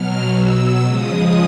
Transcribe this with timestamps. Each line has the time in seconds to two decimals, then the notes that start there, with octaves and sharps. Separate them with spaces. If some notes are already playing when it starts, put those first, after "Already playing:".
Already playing: B2 F#3 F6
0.30 B2 F#3 E6
0.84 C#3 F3 G#3 D#6